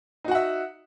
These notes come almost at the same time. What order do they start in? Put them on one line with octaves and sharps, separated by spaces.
D#4 F#4 F#5 E5